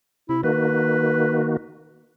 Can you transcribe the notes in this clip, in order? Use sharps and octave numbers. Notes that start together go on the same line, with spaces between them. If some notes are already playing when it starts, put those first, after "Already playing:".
C3 E4
D#3 A#3 F#4 B4